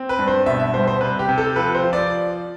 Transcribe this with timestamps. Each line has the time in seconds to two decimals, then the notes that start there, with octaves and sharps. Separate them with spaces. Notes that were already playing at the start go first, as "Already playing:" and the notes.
Already playing: C4
0.09 B4
0.19 G2
0.28 C5
0.46 B2 E5
0.60 E5
0.74 G3 C5
0.87 C5
1.01 C3 B4
1.19 G4
1.29 C3
1.38 A4
1.56 F3 B4
1.75 C5
1.83 F3
1.93 D5